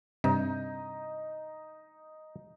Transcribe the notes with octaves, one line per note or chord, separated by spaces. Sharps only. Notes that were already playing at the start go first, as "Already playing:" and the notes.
G2 C3 D#4